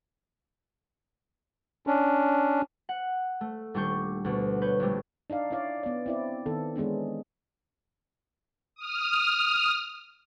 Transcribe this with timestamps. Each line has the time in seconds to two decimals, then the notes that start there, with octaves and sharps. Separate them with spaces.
1.87 C#4 D4
2.89 F#5
3.41 A3
3.74 D#1 G3 D4 C#6 G6
4.25 D2 B2
4.62 B4 C#5 G6
4.80 A#1 B2 G3 A3
5.30 D4 D#4 D5 F5
5.51 C#4 E4 C#5 D5 F5
5.83 B3 D5
6.06 C4 E4 D5
6.46 D#3 B3 A4
6.76 E3 G#3 B3 C#4 D4
8.75 D#6 F6